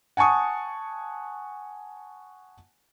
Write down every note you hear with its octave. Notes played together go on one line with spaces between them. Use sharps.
F#5 G#5 A5 C#6 D#6